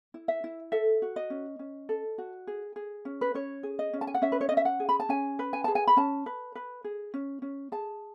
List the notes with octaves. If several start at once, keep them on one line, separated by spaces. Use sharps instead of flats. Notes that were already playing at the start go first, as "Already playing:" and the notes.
E4
E5
E4
A4 E5
F#4
D#5
C#4
C#4
A4
F#4
G#4
G#4
C#4
B4
C#4 C#5
G#4
D#5
C#4
A5
G#5
F#5
C#4 E5
B4
C#5
C#4 D#5
E5
F#5
G#4
B5
A5
C#4 G#5
B4
G#5
G#4 A5
G#5
B5
C#4 A5
B4
B4
G#4
C#4
C#4
G#4 A5